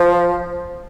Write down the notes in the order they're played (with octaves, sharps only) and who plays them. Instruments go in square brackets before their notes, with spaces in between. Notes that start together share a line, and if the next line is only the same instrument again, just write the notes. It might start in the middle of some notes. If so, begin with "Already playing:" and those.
Already playing: [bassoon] F3